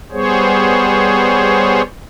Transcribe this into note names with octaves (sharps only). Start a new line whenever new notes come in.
G3 B3 G#4 C5 C#5